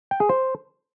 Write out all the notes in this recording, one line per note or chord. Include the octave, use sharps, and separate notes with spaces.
G5
G#4
C5